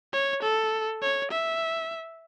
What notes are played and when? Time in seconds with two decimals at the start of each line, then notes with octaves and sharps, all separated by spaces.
0.13 C#5
0.43 A4
1.02 C#5
1.31 E5